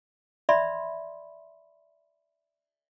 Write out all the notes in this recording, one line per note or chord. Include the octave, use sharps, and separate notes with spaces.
D5 E5 B5 C6